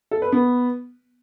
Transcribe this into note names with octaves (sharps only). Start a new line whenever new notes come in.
A4
B4
B3